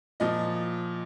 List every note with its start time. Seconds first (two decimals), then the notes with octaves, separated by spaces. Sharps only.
0.20 A#2 F3 D#5